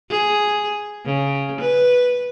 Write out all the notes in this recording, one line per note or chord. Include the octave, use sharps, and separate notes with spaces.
G#4
C#3
B4